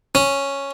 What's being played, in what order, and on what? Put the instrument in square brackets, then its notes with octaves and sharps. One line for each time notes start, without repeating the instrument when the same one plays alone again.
[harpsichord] C#4